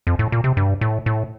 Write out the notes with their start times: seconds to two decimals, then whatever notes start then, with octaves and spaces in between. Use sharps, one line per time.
0.07 F2
0.19 A2
0.32 A#2
0.44 C3
0.57 G2
0.81 A2
1.06 A2